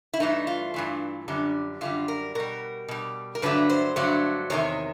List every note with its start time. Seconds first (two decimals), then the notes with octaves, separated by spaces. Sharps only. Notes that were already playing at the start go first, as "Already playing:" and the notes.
0.14 E4
0.20 G2 E3 A3 D#4
0.47 F4
0.74 G2 E3 A3
1.28 F#2 D3 G3
1.81 F#2 D3 G3 F4
2.08 A#4
2.35 B2 G3 A#4
2.88 B2 G3
3.35 A#4
3.42 G2 D3 F#3 A3 B4
3.70 C5
3.96 G2 D3 F#3 A3
4.50 E2 C3 D#3 C#5